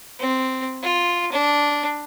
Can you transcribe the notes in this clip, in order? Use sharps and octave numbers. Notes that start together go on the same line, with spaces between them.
C4
F4
D4